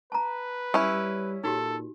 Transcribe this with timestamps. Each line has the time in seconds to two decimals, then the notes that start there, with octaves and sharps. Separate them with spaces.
0.12 B4 A5 A#5
0.74 G3 C#4 E4
1.44 A#2 D#4 F#4 G4 A4